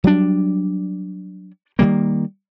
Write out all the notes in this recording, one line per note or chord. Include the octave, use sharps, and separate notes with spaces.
F#3 G3 D4
D#3 F3 G3 A#3